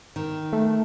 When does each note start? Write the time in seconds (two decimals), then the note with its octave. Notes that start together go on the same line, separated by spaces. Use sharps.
0.16 D#3
0.53 A3